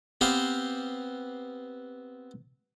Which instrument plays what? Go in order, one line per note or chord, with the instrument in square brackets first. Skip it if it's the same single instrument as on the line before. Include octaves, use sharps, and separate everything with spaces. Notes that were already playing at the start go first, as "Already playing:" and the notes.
[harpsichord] B3 C4 G4 B4 C5 F5